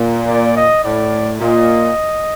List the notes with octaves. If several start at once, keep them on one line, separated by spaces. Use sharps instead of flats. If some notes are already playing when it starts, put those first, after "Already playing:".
Already playing: A#2
D5
D#5
A2 D5
A#2 D#5